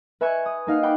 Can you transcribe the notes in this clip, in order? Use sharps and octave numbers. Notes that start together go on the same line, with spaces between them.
B4 E5 G#5 B5 C#6 G#6
D#6
A#3 D#4 F5 F#5
D5 F#5 G5 B5 D6